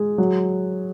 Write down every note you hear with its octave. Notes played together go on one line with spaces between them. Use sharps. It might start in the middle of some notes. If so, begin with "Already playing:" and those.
Already playing: G#3
F#3